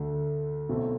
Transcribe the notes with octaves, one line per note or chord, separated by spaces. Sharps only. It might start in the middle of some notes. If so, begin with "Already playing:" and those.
Already playing: D2 D3 A3
B1 B2 A3 C4 E4